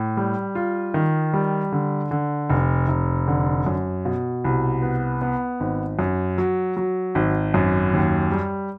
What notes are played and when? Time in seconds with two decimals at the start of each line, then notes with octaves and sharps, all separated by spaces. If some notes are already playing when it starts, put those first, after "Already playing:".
Already playing: A2
0.17 G3
0.55 F4
0.94 D#3
1.34 G3
1.72 D3
2.11 D3
2.50 F1
2.88 F1
3.28 D3
3.66 F#2
4.05 B2
4.44 C2
4.82 B3
5.22 B3
5.60 G#1
5.99 F#2
6.38 F#3
6.77 F#3
7.15 G#1
7.54 F#2
7.93 D#2
8.32 G3